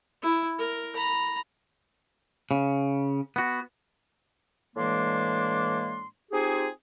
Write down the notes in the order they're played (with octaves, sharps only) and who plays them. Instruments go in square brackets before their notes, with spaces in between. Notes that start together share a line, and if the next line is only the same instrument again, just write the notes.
[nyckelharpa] E4
A#4
A#5 B5
[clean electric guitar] C#3
B3 F#4
[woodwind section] A2 E3 G#3 A#3 D4 C6
C4 D#4 F4 G4 G#4